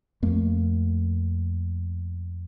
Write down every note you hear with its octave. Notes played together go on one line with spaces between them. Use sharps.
F2 A3 A#3